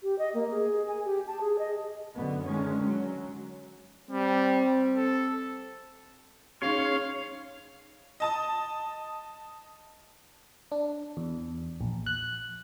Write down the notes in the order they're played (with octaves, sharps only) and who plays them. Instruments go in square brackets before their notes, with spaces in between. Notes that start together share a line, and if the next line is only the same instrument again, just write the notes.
[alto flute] G4
D#5
A#3
G#4
G#5
G4
A5
G#4
D#5
[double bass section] F#2 D3 B3
D3 D#3 G#3 C#4
F#3
[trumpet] G3 [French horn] C4
[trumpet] A4
[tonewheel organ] C#4 C6 [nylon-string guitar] D#4 G#4 [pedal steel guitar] C#5 [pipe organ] F5
[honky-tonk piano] D#5 A5 D#6
[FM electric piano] D4
E2
A#1
F#6